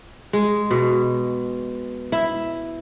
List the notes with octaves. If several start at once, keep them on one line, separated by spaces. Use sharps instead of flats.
G#3
B2
E4